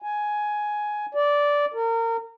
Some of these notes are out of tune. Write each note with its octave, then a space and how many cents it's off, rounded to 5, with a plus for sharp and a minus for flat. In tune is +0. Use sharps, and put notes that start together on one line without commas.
G#5 +10
D5 -10
A#4 -30